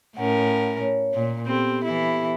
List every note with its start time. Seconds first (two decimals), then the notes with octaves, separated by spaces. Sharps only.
0.17 A2 C#4 A#4 F#5
0.81 C#5
1.14 A#2
1.46 B3 C4 G4 A4
1.84 E3 E4